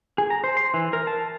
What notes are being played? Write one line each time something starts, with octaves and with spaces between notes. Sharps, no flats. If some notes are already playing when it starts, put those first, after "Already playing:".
G#4
A#5
C5
C6
E3
A#4
A5